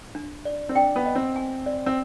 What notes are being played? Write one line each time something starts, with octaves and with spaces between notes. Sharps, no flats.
D4
D5
C4
D4 G5
B3
D#5
C4
G#5
D5
C4